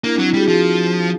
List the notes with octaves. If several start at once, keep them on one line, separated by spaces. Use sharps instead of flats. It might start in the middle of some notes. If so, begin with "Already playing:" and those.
A#3 D4 E4
F#3 C4 D4
D4 E4
G3 F#4 G#4
F3 F#4 G#4